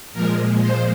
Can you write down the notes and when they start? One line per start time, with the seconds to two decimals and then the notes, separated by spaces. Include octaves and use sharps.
0.13 A#2 F3 G#3 A#4
0.60 C5